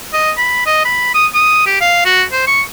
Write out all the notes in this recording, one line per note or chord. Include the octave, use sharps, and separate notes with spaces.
D#5
B5
D#5
B5
D#6
D#6
G4
F5
F#4
C5
C#6